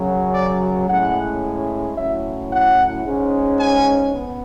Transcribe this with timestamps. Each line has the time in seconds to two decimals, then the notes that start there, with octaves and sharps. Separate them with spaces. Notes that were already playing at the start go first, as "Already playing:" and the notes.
Already playing: F#2 C#3 F#3
0.34 D5
0.88 A2 G#3 C#4 E4 F#5
1.97 A2 F#3 C#4 E4 E5
2.51 F#5
3.05 G#2 G#3 C#4
3.60 G#5
4.14 B3